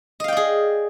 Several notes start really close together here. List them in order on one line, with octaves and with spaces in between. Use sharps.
D#5 F5 G5 D5 G#4